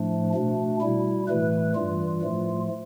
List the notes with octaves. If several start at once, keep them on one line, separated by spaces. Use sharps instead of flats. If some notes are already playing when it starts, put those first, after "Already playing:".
Already playing: A2 F3 A3 D4
B2 A3 D4
B2 G3 E4
A2 E3 A3 B4
G2 E3 G3 F4
A2 F3 A3